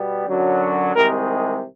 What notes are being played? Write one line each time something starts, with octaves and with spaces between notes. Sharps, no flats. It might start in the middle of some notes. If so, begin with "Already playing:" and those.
Already playing: B2 G3 B3
F#2 D3 F#3
C2 C3 D#3 G#3 A#4